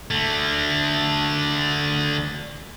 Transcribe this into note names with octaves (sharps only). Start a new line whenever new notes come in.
D3 A3